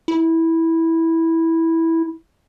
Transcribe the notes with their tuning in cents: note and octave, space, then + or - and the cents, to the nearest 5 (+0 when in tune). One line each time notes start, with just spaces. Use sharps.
E4 -10